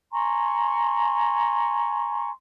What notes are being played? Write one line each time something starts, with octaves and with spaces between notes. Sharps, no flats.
G#5 A#5 C6 C#6